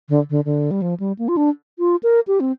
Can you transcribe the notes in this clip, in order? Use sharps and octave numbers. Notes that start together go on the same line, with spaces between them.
D3
D3
D3
G3
F3
G3
A#3
F4
D4
F4
A#4
G4
C4